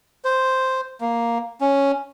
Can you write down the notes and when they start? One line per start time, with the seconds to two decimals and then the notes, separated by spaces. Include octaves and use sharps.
0.25 C5
1.01 A#3
1.61 C#4